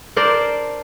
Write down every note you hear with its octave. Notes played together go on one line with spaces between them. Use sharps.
D4 A#4 C5 D5